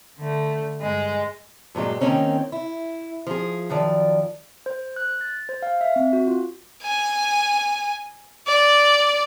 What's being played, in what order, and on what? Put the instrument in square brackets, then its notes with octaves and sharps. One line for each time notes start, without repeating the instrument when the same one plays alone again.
[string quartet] D3 A3
G2 G#3
[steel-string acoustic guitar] G2 A#2 F#3 G#3
D#3 E3 A#3 C4 C#4 D#4
E4
F3 G#4
F#2 D#3 F3 D5
[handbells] C5
F#6
A6
C5
F5
E5
C4
F#4
F4
[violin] G#5
D5